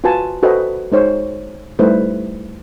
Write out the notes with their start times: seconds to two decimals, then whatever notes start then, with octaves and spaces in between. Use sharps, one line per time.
0.04 F4 F#4 B4 G#5 A5
0.43 F#4 A4 B4 C5 D#5 G5
0.92 G#3 D#4 C5 C#5
1.79 G3 A3 D#4 E4 B4 C5